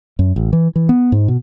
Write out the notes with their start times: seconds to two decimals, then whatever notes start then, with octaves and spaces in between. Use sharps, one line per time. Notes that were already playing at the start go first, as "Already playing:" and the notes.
0.19 F#2
0.36 A1
0.53 E3
0.76 E3
0.89 B3
1.12 G#2
1.28 B2